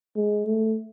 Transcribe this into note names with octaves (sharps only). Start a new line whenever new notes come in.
G#3
A3